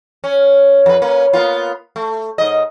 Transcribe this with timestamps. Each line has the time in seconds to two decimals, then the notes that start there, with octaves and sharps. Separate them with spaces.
0.24 C#4
0.86 F2 B4
1.02 A#3 C#4 B4
1.33 A#3 B3 F4
1.96 A3
2.38 G#2 D#5